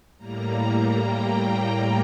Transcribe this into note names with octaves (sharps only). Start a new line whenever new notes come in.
A2 G3 A#3 A#5
G5